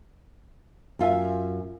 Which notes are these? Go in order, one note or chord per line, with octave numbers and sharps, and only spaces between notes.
F#2 F4 E5 G#5